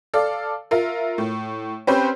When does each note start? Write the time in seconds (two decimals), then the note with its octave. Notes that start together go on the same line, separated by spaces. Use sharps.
0.14 A4 D5 F5
0.71 F4 A#4 E5
1.18 A2
1.87 C4 C#4 G4 B4 C5 G5